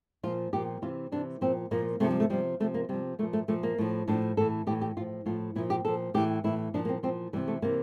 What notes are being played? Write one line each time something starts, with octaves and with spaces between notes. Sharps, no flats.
A#2 F3 F4
A#2 F3 G4
C3 E3 F4
C3 E3 D4
A#2 F3 C4
A#2 F3 A#3
C3 F3 A3
G3
A3
C3 F3 G3
C3 F3 A3
A#3
C3 F3 G3
A#2 F3 A3
A3
A#2 F3 A3
A#3
A2 F3
A2 F3 D4
A2 E3 A4
A2 E3 G4
G4
A2 F3 F4
A2 F3 F4
A#2 F3 E4
G4
A#2 F3 A4
A2 E3 G4
A2 E3 E4
A#2 F3 D4
A#3
C4
A#2 F3 C4
C3 E3 G3
A3
C3 E3 A#3